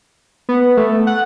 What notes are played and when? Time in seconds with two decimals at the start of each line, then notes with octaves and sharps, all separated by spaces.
0.49 B3
0.77 A3
1.07 F#5